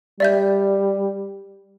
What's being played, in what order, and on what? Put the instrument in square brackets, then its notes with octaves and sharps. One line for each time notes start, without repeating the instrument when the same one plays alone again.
[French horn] G3 [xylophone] D5 E5 G6